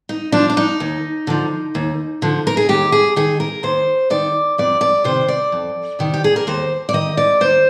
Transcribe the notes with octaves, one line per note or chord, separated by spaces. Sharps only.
D#4
F3 D4
D4
D#4
D#2
D3 F3
D#2
D3 F3
A#4
G#4
D#2 G4
G#4
D#3 G#4
A#4
D#2 C5
D#3 D5
F2 D5
D5
C3 D#3 C5
D5
F2
C3 D#3
G4
G#4
A#4
D#2 C5
D5
D#3 D#5
D5
D#2 C5